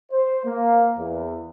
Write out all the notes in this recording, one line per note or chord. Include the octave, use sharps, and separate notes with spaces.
C5
A#3
E2